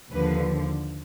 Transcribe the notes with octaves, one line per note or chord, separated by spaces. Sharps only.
D#2 D3 F3 B4